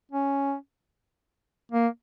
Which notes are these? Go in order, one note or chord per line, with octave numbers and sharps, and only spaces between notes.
C#4
A#3